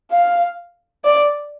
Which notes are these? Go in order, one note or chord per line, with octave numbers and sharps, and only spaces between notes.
F5
D5